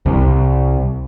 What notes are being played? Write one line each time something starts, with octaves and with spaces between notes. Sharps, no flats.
C2